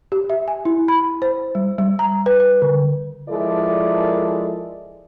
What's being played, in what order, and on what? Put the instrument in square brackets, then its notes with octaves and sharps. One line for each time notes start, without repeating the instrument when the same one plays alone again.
[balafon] G4
E5
G#5
E4
B5
C5
G3
G3
A#5
B4
B4
D3
[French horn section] F3 G#3 E4 A4 A#4 D5